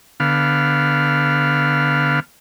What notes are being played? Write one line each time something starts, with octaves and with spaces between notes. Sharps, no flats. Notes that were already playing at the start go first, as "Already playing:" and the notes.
D3 B3 F5